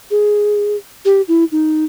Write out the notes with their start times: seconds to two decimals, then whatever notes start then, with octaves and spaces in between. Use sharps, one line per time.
0.11 G#4
1.05 G4
1.28 E4
1.52 D#4